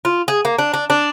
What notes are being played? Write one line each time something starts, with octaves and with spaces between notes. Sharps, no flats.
F4
G#4
A#3
D4
D4
D4